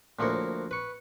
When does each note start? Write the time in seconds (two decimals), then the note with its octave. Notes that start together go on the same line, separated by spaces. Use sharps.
0.19 D2 F3 A#3 E4 C#5
0.71 B4 C#6